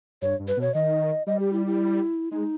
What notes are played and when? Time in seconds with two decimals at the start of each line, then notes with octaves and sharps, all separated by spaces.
0.22 G2 C#5
0.39 G2
0.48 B4
0.57 B2 C#5
0.74 D#3 D#5
1.27 G3 D#5
1.39 G4
1.53 E4
1.66 E4
2.31 G#3 D#4